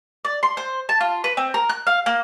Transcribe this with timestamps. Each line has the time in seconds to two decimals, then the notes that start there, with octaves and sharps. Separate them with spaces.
0.25 D5
0.43 C6
0.57 C5
0.89 A5
1.01 F4
1.24 B4
1.37 C4
1.54 A#4
1.69 F#6
1.87 F5
2.06 A#3